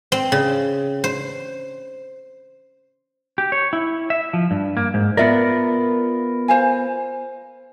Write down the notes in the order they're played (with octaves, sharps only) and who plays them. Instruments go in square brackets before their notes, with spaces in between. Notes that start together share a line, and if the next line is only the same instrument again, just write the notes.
[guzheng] C4
C#3
C5
[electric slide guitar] G4
C#5
E4
E5
F3
G2
A#3
G#2
[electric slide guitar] B3 F4 A#4 [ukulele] D5 E5
[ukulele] C5 F5 G#5